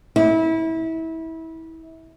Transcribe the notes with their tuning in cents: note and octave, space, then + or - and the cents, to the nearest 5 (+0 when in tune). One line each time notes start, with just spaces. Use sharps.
E4 -25